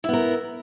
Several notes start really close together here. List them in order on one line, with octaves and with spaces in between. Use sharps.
E4 B3 A#4